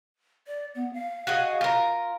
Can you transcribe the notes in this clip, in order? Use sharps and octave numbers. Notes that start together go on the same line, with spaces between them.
D5
B3
F5
F#4 G#4 D#5
F4 A#4